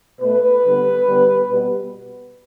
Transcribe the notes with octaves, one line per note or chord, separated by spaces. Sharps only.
B2 A3 B4
D3 G3 B3
D3 G3 B3
B2 G3 B3